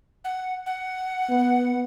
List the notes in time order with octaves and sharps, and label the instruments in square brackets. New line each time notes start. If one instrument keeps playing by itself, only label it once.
[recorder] F#5
F#5
[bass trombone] B3